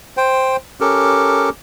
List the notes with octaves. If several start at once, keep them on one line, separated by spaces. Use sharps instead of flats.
C5 G5
C#4 G4 A4 A#4